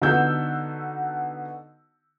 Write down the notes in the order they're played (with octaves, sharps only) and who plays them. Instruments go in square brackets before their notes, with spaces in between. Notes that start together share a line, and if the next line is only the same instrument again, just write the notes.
[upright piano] D3 B3 D#4 F#4 E6 G6